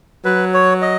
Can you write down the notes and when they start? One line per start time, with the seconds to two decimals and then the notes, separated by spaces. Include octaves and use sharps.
0.25 F#3 B4
0.54 C#5
0.82 D#5